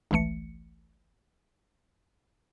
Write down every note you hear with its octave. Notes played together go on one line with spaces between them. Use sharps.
G#1 C#2 E3 A3 C#7